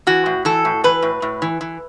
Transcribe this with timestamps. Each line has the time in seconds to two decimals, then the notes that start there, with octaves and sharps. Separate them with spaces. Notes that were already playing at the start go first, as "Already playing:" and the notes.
0.07 E3 F#4
0.26 A2
0.45 E3 A4
0.65 A2
0.84 E3 B4
1.02 A2
1.22 A2
1.42 E3
1.61 E3